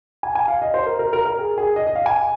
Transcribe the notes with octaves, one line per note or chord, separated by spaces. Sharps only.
G#5
G#5
F5
D#5
C5
A#4
A#4
A#4
A#4
G#4
G#4
D#5
D#5
F5
G#5